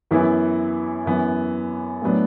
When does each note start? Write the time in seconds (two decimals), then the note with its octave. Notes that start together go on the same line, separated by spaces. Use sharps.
0.11 F#2 E3 B3 E4
1.06 F#2 E3 B3
2.02 A2 F#3 B3 D4